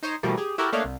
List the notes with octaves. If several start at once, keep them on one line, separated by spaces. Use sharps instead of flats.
D#4 C5 C#5 D#5
B2 E3 F3 G3 A3 A#3
G4 G#4
E4 F#4 G4 A4 A#4
A3 A#3 D4 C#5 D#5 F5
C2